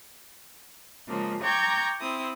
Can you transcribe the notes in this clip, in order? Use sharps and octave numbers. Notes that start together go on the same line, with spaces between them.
C#3 F3 G#3 A#3
G5 A#5 C#6 D6 G6 G#6
C4 E4 D#6